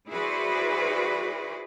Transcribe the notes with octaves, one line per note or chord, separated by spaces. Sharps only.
E4 F#4 G#4 B4 C5 D5